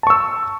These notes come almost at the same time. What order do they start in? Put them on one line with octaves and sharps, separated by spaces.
A5 C#6 E6